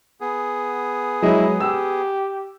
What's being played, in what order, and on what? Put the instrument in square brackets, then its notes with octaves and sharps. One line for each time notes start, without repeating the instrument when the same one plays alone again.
[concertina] B3 G#4
[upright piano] F#3 G#3 D#5 [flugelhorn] E4
[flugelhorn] G4 [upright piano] E6